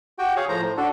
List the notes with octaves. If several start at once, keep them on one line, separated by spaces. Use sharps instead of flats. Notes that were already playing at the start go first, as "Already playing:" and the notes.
F#4 G4 G5
G#4 C#5 F5
A2 F3 C5 A#5
A2
D4 F#4 A4